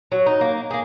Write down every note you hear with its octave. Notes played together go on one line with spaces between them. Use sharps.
F#3
D#4
A#3
A#3 G#4